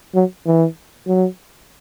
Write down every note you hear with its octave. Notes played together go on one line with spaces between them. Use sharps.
F#3
E3
F#3